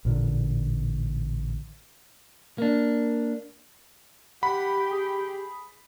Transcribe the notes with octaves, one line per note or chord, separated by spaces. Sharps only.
A1 A#2 D3
A#3 D4
G4 F#5 B5
G#4